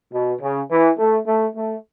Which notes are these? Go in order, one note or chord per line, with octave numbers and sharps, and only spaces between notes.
B2
C#3
E3
A3
A3
A3